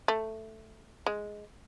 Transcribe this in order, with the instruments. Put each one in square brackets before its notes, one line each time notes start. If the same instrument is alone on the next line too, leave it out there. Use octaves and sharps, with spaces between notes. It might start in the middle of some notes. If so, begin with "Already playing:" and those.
[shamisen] A3
G#3